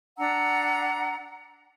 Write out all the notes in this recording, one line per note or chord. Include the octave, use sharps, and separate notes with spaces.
D4 F#5 A#5 E6